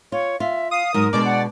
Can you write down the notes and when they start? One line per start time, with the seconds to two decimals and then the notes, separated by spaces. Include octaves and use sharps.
0.12 F4 C#5
0.40 F4 E5
0.71 F5 D#6
0.94 G#2 F#3 A#4
1.13 B2 G#3 D4 D5
1.25 F#5